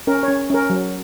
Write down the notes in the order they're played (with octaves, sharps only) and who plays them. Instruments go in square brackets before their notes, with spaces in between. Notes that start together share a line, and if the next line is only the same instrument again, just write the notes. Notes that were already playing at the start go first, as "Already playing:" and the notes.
[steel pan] C#4 A#4
C#5
C#4
C#4 A#4
F#3